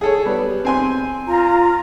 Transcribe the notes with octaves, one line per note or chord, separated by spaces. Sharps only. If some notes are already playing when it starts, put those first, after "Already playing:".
G#4 A4 C#5
G3 B3
C4 G#5 C6
F4 A#5